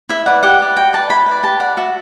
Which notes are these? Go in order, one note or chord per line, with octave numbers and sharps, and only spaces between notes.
E4 E5
B4 D5 F#5
G4 F#5
B4 D5
F#4 G5
B4 D5 A5
E4 B5
B4
D5
G4 A5
D5 F#5
F#4 E5